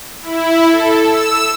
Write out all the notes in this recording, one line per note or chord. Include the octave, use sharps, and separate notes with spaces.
E4
A4
E6